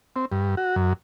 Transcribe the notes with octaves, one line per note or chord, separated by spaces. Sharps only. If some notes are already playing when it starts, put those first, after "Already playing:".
C4
G2
F#4
F#2